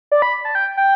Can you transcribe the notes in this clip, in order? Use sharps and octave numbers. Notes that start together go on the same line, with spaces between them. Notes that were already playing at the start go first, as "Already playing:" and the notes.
D5
B5
A5
G5
G5